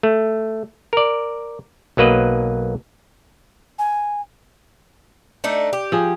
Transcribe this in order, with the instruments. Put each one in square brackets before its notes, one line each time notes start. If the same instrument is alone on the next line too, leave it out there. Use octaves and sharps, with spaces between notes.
[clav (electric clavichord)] A3
A#4 D5
B1 F#3 A#3 B4 D#5
[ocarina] G#5
[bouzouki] A3 D4 D#4
G4
[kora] F3 G#4